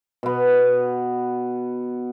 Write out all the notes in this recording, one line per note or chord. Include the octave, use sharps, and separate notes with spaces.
B2 B3